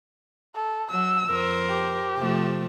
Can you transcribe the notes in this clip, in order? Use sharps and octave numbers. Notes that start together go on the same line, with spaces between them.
A4
F#3 E6
F2 A#4 C5
G4
C3 F3 A3